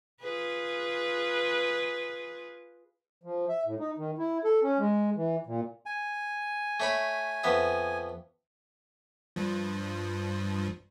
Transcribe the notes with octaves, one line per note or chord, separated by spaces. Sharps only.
F4 G#4 B4
F3
E5
A2
D#4
D#3
E4
A4
C#4
G#3
E3
A#2
G#5
A3 C#5 B5
F2 B3 E5
G2 F3